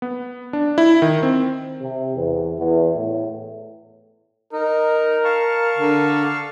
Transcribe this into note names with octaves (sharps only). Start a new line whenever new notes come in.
B3
D4
E4
D#3
C4
C3
E2
E2
A2
D#4 A#4
F5 A5 C#6
D3